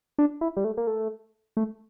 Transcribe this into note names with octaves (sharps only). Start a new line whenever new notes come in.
D4
E4
G3
A3
A#3
A3
A3